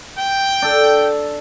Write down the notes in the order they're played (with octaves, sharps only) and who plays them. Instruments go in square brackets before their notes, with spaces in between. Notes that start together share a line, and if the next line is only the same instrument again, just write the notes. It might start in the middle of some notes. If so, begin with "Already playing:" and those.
[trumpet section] G5
[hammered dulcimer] D4 A4